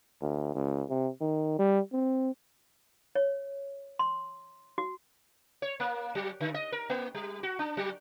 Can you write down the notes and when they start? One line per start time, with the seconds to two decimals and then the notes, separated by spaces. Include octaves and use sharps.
0.22 D2
0.55 C#2
0.89 C3
1.21 D#3
1.59 G3
1.93 C4
3.15 C#5
3.99 C6
4.78 F#4
5.62 C#5
5.80 A#3
6.15 F#3
6.40 D3
6.54 D#5
6.72 A#4
6.90 A#3
7.14 G3
7.43 F#4
7.59 D4
7.77 F#3